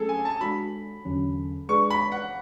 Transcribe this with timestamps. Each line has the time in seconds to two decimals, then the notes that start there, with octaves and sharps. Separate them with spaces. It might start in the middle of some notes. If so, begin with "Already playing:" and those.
Already playing: F#3 A3 C#4 G#4 A4
0.09 G#5
0.25 A5
0.41 G#3 D4 F#4 B5
1.05 E2 D3 F#3 C#4
1.69 G#3 D4 G#4 B4 D5 C#6
1.90 B5
2.12 F#5